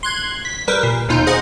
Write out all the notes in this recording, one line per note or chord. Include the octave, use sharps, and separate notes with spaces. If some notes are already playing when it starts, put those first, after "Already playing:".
C6 F#6 G#6
B6
G3 A#4 B4
A#2
D#2 B2 D#4 F4 G6
G#4 C5 D#5 F#5